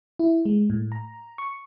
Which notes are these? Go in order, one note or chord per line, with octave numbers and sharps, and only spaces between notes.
E4
G#3
A2
A#5
C#6